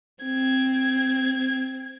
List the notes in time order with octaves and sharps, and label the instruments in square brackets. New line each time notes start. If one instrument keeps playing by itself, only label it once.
[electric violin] C4 G#6